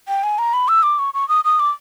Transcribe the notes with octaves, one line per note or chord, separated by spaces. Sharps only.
G5
G#5
A#5
B5
E6
D6
C#6
C#6
D#6
D#6
D6